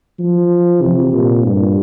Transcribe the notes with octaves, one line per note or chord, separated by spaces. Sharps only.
F3
C3
A#2
G2